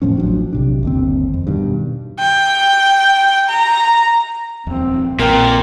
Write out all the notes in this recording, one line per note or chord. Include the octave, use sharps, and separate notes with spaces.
E1 A2 F3 C#4
A1 F3 F#3 D4
B1 C3 D4
G1 D#2 C4
F2
G2 B2 D#3
G5
A#5
D#1 F2 C4
A#1 A#2 E3 C4 A#4 G5